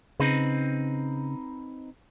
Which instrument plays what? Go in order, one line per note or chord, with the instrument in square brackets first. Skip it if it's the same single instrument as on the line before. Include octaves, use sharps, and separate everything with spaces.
[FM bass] C#3 [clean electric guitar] C4 D#4 B4